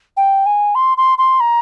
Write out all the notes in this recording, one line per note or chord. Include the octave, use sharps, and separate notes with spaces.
G5
G#5
C6
C6
C6
A#5